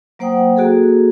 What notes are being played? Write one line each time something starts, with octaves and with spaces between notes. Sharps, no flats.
F#3 A#3 C5 F#5 G5 D#6
A#3 F#4 G#4 A4